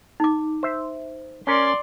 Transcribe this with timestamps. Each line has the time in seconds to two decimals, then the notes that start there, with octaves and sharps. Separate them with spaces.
0.20 D#4 D6
0.63 C5 E5
1.47 C#4 A#4 D5 C6